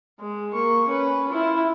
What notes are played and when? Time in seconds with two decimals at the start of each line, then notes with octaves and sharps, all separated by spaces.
0.20 G#3
0.54 A#3 C#6
0.88 C#4 B4
1.29 E4 F4